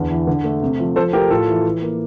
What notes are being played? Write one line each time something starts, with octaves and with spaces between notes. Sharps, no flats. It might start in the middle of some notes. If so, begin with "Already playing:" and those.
Already playing: E2 D3
E3
D3
A3
C3
F3
F3 A4 C5
A3 G4 A#4
A2 F4 A4
E3
E3
A#3